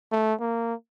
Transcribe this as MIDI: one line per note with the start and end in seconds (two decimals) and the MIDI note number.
0.12 0.34 57
0.40 0.74 58